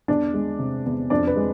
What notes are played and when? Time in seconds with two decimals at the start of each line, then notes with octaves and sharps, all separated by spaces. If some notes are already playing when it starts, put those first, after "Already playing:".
0.08 E2 D4 D5
0.34 G#3
0.59 C3
0.86 E2
1.10 F2 D4 D5
1.27 B4
1.36 G#3